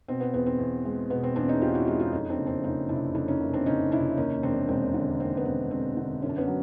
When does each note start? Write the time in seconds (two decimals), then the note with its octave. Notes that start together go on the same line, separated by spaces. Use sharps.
0.08 B2 C4
0.20 B3
0.34 E2 B3
0.46 C4
0.59 E2
0.85 G#3
1.10 B2 B3
1.23 C4
1.36 E2 C4 D4
1.48 C#4 D#4
1.61 E2 F4 G4
1.74 E4 F#4
1.87 G#3 D#4 F4
2.00 D#4 F4
2.12 F2 C#4 D#4
2.26 D#4
2.30 C4 D4
2.38 F#1
2.46 C4 D4
2.64 F#1 C#4 D#4
2.89 C3 D4 E4
3.15 F2 D4 E4
3.28 C#4 D#4
3.41 F#1
3.53 C4 D4
3.66 F#1 C#4 D#4
3.91 C3 D4 E4
4.17 D#2 C#4 D#4
4.43 E1 C4 D4
4.69 E1 C4
4.94 D3
5.19 D#2 C4
5.37 B3
5.45 E1 C4
5.71 E1 C4
5.97 D3
6.22 F#2 C#4
6.29 D4
6.37 B3 C#4
6.48 F#3